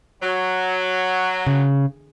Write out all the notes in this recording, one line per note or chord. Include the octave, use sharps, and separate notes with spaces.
F#3
C#3